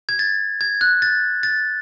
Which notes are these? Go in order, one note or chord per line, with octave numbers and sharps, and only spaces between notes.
G#6
A6
G#6
F#6
A6
A6